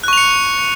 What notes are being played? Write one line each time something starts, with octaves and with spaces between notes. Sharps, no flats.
C#6 F#6 C#7 F7